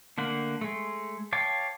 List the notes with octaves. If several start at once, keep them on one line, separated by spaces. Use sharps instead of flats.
D3 A3 A#3 F#5
G#3 A3
C#5 F5 G5 A5 D6